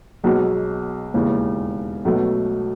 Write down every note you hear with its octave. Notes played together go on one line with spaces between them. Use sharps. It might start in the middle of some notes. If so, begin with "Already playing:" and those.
B1 B2 F#3 G#3
E1 D#2 C#3 E3
B1 B2 F#3 A3